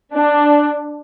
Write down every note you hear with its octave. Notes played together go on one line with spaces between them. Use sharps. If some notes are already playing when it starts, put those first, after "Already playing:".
D4